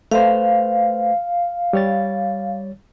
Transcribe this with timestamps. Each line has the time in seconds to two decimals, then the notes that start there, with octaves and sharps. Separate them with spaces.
0.11 A3 B4 C5 F5
1.73 G3 C#5 A6